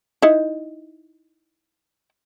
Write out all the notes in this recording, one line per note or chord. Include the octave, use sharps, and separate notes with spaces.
D#4 E4